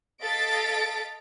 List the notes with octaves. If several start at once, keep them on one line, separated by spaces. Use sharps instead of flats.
A4 D#5 F5 A6 B6 D7